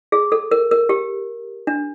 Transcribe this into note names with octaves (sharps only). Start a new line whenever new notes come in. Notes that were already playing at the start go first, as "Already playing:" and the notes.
G#4
A4
A#4
A#4
G4
D4